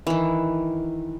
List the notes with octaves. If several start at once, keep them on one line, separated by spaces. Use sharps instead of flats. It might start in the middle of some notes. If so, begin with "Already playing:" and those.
D#3 E3